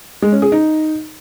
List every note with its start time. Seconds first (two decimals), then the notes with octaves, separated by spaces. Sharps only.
0.22 G#3
0.32 C#4
0.42 G#4
0.52 D#4